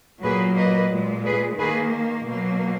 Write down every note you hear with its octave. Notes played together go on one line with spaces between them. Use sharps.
A#2 F#3 A#3 G#4 B4
B4 D#5
A#2 G#3
G#4 B4
D#3 A#3 G#4 B4
B2 F#3 A#3